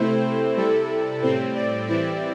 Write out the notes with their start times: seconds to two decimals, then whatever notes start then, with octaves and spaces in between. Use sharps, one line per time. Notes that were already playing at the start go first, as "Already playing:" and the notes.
Already playing: C3 A3 C4 E4 C5
0.57 C3 G3 E4 A4
1.22 A2 G3 C4 C5
1.55 D5
1.88 E3 G3 C4 E4 D5